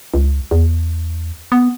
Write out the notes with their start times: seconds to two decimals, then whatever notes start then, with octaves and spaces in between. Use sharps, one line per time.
0.14 C#2
0.51 E2
1.52 B3